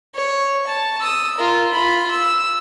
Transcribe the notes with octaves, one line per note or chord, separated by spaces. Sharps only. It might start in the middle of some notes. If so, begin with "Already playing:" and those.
C#5
A5
D#6 E6
F4 A#4
F4 B5
E6